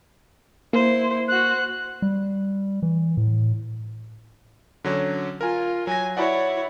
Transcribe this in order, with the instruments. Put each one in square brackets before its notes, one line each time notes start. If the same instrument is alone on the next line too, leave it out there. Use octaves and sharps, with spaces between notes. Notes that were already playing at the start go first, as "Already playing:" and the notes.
[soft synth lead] A#3 [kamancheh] E4 C5
[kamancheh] F#4 C5 [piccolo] F#6
[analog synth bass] G3
E3
A2
[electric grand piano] D3 F#3 C#4
[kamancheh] F4 [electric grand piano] A#4 G#5
[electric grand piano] F#3 A#6 [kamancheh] G#5
[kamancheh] E4 C#5 [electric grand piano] F#4 D5 F#5